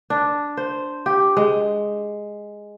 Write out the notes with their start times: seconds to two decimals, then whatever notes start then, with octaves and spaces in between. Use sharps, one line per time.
0.10 D4
0.57 C5
1.06 G4
1.37 G#3